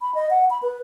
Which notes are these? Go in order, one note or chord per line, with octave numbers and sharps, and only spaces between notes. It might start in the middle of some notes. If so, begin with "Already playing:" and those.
B5
D#5
F#5
B5
B4